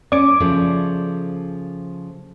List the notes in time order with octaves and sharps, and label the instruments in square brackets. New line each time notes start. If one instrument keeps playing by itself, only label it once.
[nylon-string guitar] C#4 [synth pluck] D5 D6
[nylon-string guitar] C#3 F3 A3